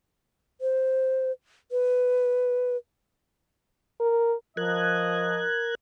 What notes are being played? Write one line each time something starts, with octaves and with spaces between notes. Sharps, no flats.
C5
B4
A#4
F3 A#4 D#5 F#6 G#6